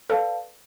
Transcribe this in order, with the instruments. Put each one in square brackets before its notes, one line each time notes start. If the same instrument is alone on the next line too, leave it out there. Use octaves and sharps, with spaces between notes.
[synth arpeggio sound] A4 [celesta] B4 D5 F5 A5